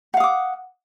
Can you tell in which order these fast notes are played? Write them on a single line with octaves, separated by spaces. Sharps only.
F#5 F5 D#6 D6